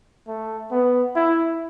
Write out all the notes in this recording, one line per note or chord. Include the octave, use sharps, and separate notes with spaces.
A3
B3
E4